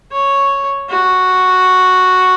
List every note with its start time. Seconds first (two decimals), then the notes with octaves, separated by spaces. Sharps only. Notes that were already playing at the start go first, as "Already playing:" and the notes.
0.12 C#5
0.90 F#4